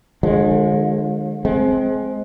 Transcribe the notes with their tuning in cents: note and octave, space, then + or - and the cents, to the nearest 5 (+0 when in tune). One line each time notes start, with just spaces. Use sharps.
D3 +45 F3 +45 G#3 +0
G#3 +25 C4 +0